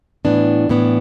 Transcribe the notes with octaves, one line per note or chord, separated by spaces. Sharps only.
A2 E3 B3 D4
A2 E3 B3 D4